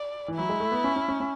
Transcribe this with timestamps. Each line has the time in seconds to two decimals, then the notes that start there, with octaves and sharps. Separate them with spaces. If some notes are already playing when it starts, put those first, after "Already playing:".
Already playing: D5
0.28 E3
0.35 F#3 E4
0.49 G#3
0.60 A3
0.72 B3
0.84 C#4
0.96 C#4
1.08 C#4
1.20 C#4